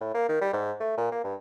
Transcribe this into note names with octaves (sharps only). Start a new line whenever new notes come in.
A2
A#3
D#3
G3
G#2
A3
A#2
A#3
G2